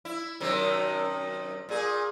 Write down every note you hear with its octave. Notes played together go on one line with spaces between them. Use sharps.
E4
F#2 C3 D#3
A#2 G#4